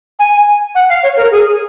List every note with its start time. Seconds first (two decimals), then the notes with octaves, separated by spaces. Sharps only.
0.19 G#5
0.75 F#5
0.89 F5
1.03 C#5
1.17 A#4
1.31 G#4